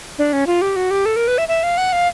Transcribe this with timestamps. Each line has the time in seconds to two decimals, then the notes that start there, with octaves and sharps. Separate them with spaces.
0.18 D4
0.33 C#4
0.47 F4
0.62 G4
0.76 F#4
0.91 G4
1.06 A4
1.16 A#4
1.28 B4
1.38 E5
1.48 E5
1.63 F5
1.78 F#5
1.93 F5